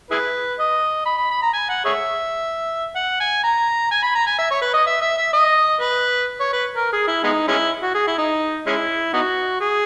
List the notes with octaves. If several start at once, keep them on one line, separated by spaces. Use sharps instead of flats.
E4 G#4 B4
D#5
B5
B5
B5
A#5
G#5
F#5
G#4 C#5 E5
F#5
G#5
A#5
G#5
B5
A#5
G#5
E5
C#5
B4
D#5
E5
E5
E5
D#5
B4
C#5
B4
A#4
G#4
E4
G#3 B3 D#4
G#3 C#4 E4
F#4
G#4
E4
D#4
G#3 C#4 E4
B3 D#4 F#4
G#4